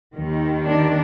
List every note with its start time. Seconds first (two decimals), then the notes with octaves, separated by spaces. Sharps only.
0.14 D#2 D#3
0.67 D4